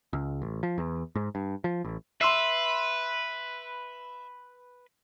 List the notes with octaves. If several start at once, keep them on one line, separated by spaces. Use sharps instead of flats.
C#2
A1
F3
E2
G#2
G2
F3
A1
B4 E5 C6 E6 C7